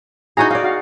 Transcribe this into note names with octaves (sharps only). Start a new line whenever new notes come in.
D#4 E4 F#4 G#4 G#5 A#5
D#4 D5 F5
F#4 F5